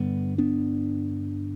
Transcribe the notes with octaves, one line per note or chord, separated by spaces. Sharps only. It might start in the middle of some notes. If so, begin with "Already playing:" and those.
Already playing: G2 D3 G3 B3
B3 D4